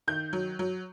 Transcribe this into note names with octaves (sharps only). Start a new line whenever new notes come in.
D#3 G6
F#3
F#3